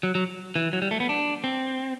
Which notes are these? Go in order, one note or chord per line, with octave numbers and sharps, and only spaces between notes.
F#3
F#3
E3
F#3
G3
A3
B3
D4
C4